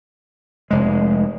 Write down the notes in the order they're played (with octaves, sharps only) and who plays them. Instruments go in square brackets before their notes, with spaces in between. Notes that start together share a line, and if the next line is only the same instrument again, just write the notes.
[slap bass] F1 G#3